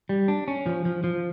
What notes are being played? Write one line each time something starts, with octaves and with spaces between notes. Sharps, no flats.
G3
D4
C#4
F3
F3
F3